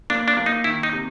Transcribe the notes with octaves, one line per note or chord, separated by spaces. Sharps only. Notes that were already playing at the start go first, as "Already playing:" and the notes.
A#3 D4
D4
A#3
D#4
D#3 E4
D#4
C3